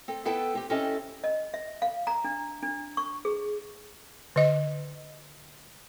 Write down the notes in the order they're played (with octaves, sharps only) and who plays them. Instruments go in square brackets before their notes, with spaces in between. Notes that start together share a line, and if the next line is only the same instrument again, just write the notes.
[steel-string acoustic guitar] C4 A4
B3 E4 A4 B4 G5 A5
C4 G4
C4 C#4 E4 G4 A4 D#5
[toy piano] D#5
E5
F5
A#5
D4
D4
C#6
G#4
[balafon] D3 D#5